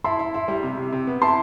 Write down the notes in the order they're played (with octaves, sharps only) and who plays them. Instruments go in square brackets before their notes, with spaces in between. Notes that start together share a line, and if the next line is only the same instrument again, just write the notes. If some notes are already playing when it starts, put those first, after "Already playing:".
[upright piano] E4 [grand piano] A5 C6
[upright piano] E4
E4
G3
C3
C3
C3
B3
[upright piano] E4 [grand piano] A5 C6